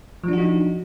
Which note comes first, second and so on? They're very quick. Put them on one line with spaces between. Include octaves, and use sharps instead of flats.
F3 D4 F#4 D#4